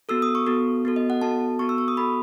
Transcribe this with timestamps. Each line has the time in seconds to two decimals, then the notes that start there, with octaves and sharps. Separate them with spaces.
0.09 B3 F#4 A4 E6
0.22 D#6
0.35 C#6
0.46 B3 F#4 A4
0.85 B3 F#4 A4
0.96 D#5
1.10 F#5
1.22 B3 F#4 A4 A5
1.59 B3 F#4 A4 C#6
1.69 E6
1.78 C#6
1.88 D#6
1.97 B3 F#4 A4 B5